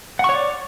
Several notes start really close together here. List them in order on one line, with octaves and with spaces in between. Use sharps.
F#5 C#6 C#5 D5